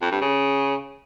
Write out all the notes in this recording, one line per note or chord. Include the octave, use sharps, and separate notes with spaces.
F2
G2
C#3